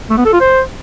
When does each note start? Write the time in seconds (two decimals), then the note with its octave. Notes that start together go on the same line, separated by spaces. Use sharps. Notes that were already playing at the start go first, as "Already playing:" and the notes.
0.10 A3
0.18 B3
0.25 A4
0.33 F4
0.41 C5